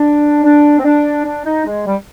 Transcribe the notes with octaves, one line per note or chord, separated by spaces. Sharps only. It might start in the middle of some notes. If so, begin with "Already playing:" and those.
Already playing: D4
D4
C4
D4
D4
D#4
G#3
G3